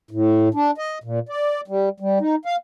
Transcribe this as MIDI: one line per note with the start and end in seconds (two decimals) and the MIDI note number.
0.11 0.49 45
0.54 0.71 62
0.78 0.98 75
1.04 1.19 46
1.29 1.61 74
1.68 1.89 55
2.00 2.19 55
2.20 2.35 63
2.45 2.56 77